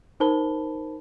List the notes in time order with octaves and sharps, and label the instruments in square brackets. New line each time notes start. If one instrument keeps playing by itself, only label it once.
[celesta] D#4 A#4 C5 A5 B5 G7